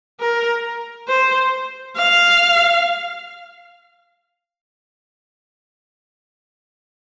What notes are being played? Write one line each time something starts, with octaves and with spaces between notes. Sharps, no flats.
A#4
C5
F5